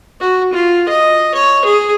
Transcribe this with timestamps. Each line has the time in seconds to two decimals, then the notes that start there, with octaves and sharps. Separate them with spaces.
0.20 F#4
0.53 F4
0.88 D#5
1.34 C#5
1.65 G#4